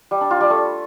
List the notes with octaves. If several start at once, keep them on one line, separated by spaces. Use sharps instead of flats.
G3
D4
F4
G3
A3